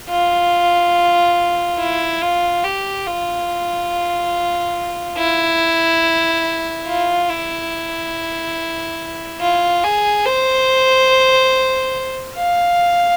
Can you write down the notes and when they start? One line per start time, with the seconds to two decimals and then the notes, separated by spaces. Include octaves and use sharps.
0.10 F4
1.80 E4
2.22 F4
2.64 G4
3.07 F4
5.18 E4
6.87 F4
7.29 E4
9.41 F4
9.84 G#4
10.25 C5
12.37 F5